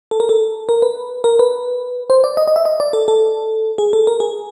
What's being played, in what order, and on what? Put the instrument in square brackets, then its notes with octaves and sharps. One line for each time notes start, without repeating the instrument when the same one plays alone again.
[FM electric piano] A4
A#4
A4
A#4
B4
A#4
B4
C5
D5
D#5
D#5
E5
D#5
D5
A4
A4
G#4
A4
A#4
G#4